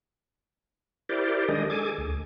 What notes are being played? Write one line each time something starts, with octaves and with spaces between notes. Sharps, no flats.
E4 G4 A#4 C5 D5
D#3 G#3 D4 G#4 D#5
G#4 A4 G#5 D6
D2